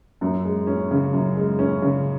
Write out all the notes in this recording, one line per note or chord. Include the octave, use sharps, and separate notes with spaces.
F#2
G#3
C#4
C#3
F#2
G#3
C#4
C#3